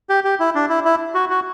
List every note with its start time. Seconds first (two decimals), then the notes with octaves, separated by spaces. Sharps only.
0.09 G4
0.24 G4
0.40 E4
0.55 D4
0.69 E4
0.85 E4
1.15 F#4
1.30 F#4